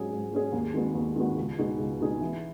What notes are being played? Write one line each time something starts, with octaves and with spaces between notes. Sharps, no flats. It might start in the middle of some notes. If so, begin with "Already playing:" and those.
Already playing: G#2 F#3 C#4 G#4
G#2
F#3 C#4 G#4
D#2
D#3 G#3 B3 F#4
D#2
D#3 G#3 B3 F#4
C#2
B2 G#3 D#4 G#4
C#2
B2 G#3 D#4 G#4
E3